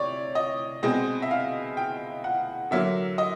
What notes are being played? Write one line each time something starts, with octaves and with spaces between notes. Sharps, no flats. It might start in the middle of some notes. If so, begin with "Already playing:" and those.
Already playing: C3 C#5 D5
D#5
B2 G#3 C4 D#5
E5
F5
G5
F#5
D3 F#3 A#3 E5
D#5